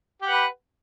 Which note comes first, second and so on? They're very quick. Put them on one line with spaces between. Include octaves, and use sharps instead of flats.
G4 F#5 B4